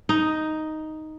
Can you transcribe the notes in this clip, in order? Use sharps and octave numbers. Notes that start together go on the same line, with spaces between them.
D#4